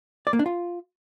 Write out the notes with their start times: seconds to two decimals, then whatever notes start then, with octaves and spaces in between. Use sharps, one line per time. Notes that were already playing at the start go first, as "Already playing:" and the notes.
0.27 D5
0.33 A#3
0.39 D4
0.46 F4